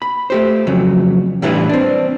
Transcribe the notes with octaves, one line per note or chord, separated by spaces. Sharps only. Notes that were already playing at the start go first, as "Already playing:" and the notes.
B5
A3 G4 C5
F2 C#3 F#3
A2 E3 G3 D4 E4 B4
C4 D4